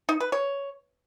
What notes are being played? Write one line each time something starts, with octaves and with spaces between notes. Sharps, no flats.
D#4
B4
C#5